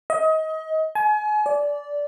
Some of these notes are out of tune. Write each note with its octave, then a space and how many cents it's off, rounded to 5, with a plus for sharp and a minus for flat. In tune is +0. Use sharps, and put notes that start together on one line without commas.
D#5 +30
G#5 +35
D5 -15